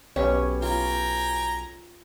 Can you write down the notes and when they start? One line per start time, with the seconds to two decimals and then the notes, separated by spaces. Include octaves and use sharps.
0.16 B1 B3 C#4 G4 C#5
0.62 F4 G5 G#5 A#5